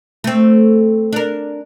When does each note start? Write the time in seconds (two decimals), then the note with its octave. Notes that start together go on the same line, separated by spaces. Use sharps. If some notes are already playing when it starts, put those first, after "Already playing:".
0.24 A3 C4
1.13 D4 A#4